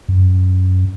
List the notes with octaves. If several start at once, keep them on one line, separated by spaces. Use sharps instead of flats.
F#2